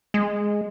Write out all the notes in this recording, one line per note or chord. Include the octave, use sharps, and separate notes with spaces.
G#3